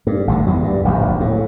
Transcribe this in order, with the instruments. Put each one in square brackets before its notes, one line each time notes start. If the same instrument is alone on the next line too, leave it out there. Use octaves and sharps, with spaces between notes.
[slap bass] G2
G#1 D2 D3
E2 F#3
G2
D1 A#1 D#2
A2